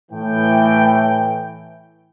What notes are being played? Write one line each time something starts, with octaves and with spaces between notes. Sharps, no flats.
A2 E3 G5